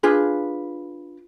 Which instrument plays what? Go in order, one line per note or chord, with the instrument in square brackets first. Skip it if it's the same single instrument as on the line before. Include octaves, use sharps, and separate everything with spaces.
[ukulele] D4 F4 G#4 B4